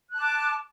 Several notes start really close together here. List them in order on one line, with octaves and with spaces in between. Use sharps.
F#6 A5 D6